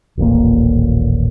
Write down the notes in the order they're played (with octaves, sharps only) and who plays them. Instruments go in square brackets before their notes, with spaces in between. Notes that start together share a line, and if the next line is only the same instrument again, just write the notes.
[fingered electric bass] D#1 A1 A#2 A#3